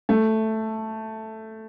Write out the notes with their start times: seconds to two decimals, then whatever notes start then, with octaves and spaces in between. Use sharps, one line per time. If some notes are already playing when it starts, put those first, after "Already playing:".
0.09 A3